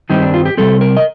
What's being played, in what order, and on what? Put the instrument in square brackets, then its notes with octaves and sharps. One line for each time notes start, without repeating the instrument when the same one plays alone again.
[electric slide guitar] G2 D#3 G3 C4 D#4
D4
F4
G4
C3 G3 C4 A4
A#4
D#5